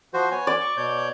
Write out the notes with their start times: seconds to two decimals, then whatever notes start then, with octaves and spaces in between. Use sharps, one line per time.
0.14 F3 F#4 C5
0.31 B3 C#5 G#5
0.47 D5
0.61 C#6
0.77 B2 C#5 G6